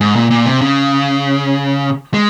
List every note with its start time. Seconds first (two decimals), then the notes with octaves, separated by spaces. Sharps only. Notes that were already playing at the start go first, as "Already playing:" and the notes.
0.01 G#2
0.16 A#2
0.31 A#2
0.46 C3
0.61 C#3
2.14 G#3